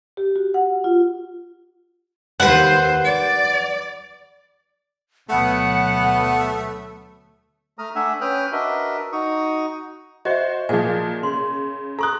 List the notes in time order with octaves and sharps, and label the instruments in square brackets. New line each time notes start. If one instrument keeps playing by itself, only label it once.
[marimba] G4
F#4
F#5
F4
[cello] D#2 C5 [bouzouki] B4 F#5
[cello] D5
[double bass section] D2 B2 F#3 [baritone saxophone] A3 [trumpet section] B3 [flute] F#5
[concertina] A3 A#5 D#6 F6
A3 D4 E5 F#5 G#5 E6
C#4 B4 G5 D#6 F6 F#6
D4 F#4 A#4 B4 D#5 E5
D#4 F#4 C#6 D#6
[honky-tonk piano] F#4 C5 [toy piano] D#5 E5
[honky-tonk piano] A#2 F3 [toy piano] G#4 A#4 G#5
[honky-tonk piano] C#3 [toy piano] C6
[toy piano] A4 C#6 D#6 [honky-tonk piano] A#5 F#6